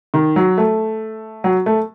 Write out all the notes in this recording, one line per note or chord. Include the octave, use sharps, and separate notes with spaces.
D#3
F#3
A3
F#3
A3